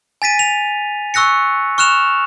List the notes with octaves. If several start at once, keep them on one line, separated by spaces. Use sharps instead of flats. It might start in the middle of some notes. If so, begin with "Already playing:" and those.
G#5 A6 B6 D#7
F7
C#6 E6 F#6 A#6 C#7
C#6 F6 F#6 E7 F7